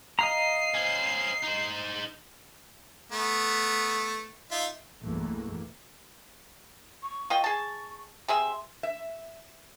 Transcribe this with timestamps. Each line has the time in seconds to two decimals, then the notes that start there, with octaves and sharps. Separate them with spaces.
0.19 D#5 F5 A#5 C7
0.74 C#4 C5
1.43 D#4 C5
3.12 A3 B3
4.51 D#4 F4 E5
5.02 B1 E2 G2 E3 A3 A#3
7.02 C#6
7.30 F4 D#5 G5
7.44 G#4 A5
8.28 C3 G#4 E5 C6
8.83 E5